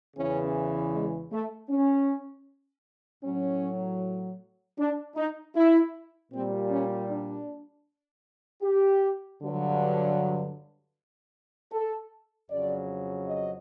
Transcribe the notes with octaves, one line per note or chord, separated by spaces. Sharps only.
E2 C#3 E3 C#4
G#3
A3
C#4
A2 F#3 C#4
D4
D#4
E4
A#2 G3 C4
C#4
D4
G4
G2 D3 F#3
A4
F2 C#3 F#3 D5
D#5